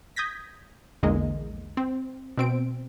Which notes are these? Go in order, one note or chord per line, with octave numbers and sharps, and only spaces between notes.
D#6 G6 G#6 A#6 B6
A#1 E2 D3 G#3 A#3 D#5
C4
B2 C4 D7